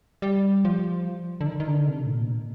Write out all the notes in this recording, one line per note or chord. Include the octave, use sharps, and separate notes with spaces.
G3
F3
D3
D#3
D#3
D3
C3
A2
A#2